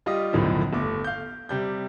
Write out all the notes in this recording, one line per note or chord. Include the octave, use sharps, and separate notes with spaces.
G3 F4 G4 D#5 D#6
B1 F#2 A2 D3 D#3 F3
G1 A3 D6
F5 G6
C3 G3 G6